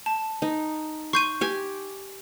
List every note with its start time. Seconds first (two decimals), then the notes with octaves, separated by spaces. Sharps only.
0.06 A5
0.42 D#4
1.13 C6 C#6 G6 D#7
1.41 G4 G#5